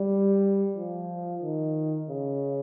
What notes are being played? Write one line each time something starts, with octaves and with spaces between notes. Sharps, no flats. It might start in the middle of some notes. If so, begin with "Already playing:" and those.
Already playing: G3
F3
D#3
C#3